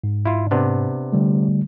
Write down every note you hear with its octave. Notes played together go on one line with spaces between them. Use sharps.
G#2
E4 F4
C3 B3 D4
D3 G3 A3